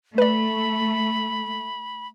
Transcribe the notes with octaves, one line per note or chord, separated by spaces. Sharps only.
A3 B4 D5 B5